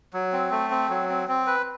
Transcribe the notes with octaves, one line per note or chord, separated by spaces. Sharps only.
F#3
C4
A3
C4
F#3
C4
C4
B4